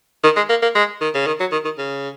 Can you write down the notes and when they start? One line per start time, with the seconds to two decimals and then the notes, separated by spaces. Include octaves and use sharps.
0.24 D#3
0.36 G#3
0.49 A#3
0.62 A#3
0.75 G#3
1.01 D#3
1.15 C#3
1.27 D#3
1.40 F#3
1.52 D#3
1.65 D#3
1.78 C#3